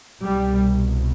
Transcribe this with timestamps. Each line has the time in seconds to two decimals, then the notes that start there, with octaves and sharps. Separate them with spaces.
0.22 C2 B2 G3